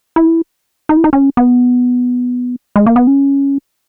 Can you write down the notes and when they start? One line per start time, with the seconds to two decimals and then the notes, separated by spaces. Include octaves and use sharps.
0.16 E4
0.89 D#4
0.97 E4
1.04 D#4
1.13 C#4
1.37 B3
2.76 G#3
2.86 A#3
2.96 B3
3.07 C#4